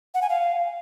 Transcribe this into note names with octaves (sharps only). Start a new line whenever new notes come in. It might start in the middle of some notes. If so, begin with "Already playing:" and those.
F#5
G#5
F5